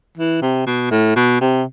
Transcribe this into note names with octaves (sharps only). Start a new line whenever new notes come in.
E3
C3
B2
A2
B2
C3